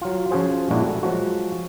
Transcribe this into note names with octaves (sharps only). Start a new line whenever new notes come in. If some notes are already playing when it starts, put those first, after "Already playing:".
F#3 F4
F3 C#4 F4 F#4 G#4 C5
A#2 G#3 D4 E4 F#4 G4
A3
F3 F#3 G#3 F#4